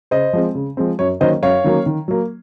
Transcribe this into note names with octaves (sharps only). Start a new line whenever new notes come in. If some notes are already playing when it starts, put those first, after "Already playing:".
C#3 C5 D#5
F3 G#3 C4
C#3
F3 G#3 C4
F#2 C#5
D#3 F#3 A#3 C#4 C5 D#5
F#2 C#5 F5
D#3 F#3 A#3 C#4
D#3
F#3 A#3